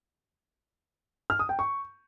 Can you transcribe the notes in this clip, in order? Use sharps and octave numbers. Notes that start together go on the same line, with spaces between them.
F6
D#6
G5
C#6